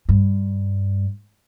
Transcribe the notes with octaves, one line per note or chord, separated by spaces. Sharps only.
G2